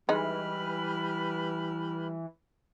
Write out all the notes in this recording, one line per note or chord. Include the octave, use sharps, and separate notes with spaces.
E3 G3 G#3 D#4 B4 B5 F6